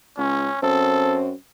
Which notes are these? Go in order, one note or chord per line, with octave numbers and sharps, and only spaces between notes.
C#2 C#4
F#2 C4 A4